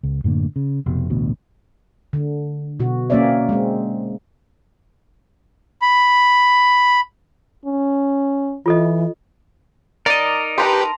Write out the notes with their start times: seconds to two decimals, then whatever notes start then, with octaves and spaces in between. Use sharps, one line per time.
0.03 C#2
0.24 F#2 A2 D3 A#3
0.56 C#3
0.86 F1 B2
1.10 A1 D2 B2
2.13 D3
2.80 B2 F#4
3.10 A#3 C4 C#4 C#5 D5 E5
3.49 G#3 C4
5.82 B5
7.66 C#4
8.66 E3 F4 A4 D#5
10.06 D#4 A#4 D5 D#5
10.58 G4 B4 A5 A#5 C6